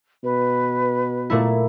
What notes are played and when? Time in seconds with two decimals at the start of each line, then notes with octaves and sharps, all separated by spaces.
0.24 B2 B4
1.30 A#2 A3 E4